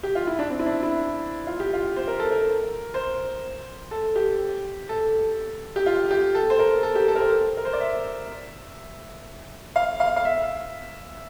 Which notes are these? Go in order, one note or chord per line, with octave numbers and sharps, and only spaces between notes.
G4
F4
E4
D4
C4
E4
D4
E4
F4
G4
F4
C5
A#4
A4
A#4
C5
A4
G4
A4
G4
F4
G4
A4
C5
A#4
A4
G4
A4
A#4
C5
A#4
C5
D5
E5
F5
F5
F5
E5